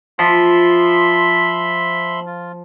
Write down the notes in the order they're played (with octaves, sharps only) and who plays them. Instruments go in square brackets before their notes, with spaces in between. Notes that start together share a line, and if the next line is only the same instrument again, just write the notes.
[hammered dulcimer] F3 [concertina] E5 B5 C6
[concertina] F4